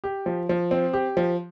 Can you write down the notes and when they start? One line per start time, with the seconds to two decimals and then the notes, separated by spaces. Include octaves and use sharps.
0.04 G4
0.26 F3
0.49 F3
0.71 C4
0.93 G4
1.17 F3